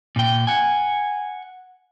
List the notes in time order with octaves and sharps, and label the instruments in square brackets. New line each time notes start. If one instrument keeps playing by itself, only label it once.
[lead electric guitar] A#2 G5
F#5 G#5